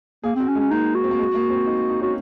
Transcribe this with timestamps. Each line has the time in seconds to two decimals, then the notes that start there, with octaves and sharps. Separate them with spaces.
0.24 A#3 G#4
0.36 C4 F#4
0.47 C#4
0.55 G#3
0.59 C#4
0.71 A#3 D#4
0.95 F#4
1.04 C4
1.11 A#3
1.19 G#3
1.35 A#3
1.50 C4
1.66 D#4
1.90 D#4
2.02 C#4 F#4